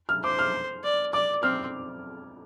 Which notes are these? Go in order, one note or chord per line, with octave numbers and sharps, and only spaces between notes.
F6
C5 D6
F6
D5
D5 D6
C4 F6